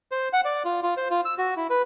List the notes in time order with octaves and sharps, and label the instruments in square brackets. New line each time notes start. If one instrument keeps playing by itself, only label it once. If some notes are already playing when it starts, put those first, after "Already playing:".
[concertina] C5
F#5
D5
F4
F4
C5
F4
E6
F#4
E4
B4